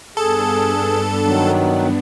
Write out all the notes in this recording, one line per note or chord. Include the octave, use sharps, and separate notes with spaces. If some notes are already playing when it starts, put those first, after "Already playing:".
G2 B3 D4 G#4 A4
D#3 F#3